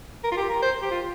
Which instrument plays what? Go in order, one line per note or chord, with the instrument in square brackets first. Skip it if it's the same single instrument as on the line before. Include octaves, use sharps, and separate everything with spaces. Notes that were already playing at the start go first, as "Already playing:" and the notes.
[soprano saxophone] A#4
F4
G4
A#4
C5
G4
F4